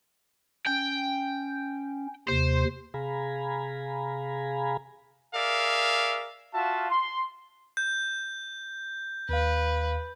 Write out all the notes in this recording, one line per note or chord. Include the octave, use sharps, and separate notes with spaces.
C#4 G5
D#2 C3 C5
C3 G#4 F5 G#5 A#5 B5
G#4 A#4 D5 E5 F5
F4 F#4 E5 F5 A5
C6
G6
D#2 B4 F5